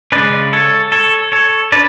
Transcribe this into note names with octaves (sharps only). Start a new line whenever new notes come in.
C#3 G#3 C#4 B4 D5
A4 C#5
A4 C#5
A4 C#5
D4 B4 D5